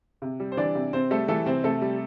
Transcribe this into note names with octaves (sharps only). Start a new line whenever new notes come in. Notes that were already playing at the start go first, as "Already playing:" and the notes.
C3
G3
C5
E3 D4 D5
C3
C3 C4 C5
G3 A3 A4
E3 A3 A4
C3 C4 C5
C3 A3 A4
G3